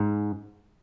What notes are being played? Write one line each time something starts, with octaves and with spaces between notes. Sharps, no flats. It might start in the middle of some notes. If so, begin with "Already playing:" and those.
Already playing: G#2